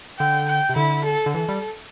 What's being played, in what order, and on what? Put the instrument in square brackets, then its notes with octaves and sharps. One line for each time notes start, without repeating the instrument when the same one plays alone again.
[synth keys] D3 [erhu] G5
[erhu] G5
[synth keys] C3
[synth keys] D3 [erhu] E4
[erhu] A4
[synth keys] D3
[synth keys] E3 [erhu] A4
[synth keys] G3